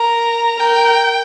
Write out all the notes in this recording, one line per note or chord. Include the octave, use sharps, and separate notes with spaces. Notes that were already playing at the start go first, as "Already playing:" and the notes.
Already playing: A#4 A#5
A#4 G5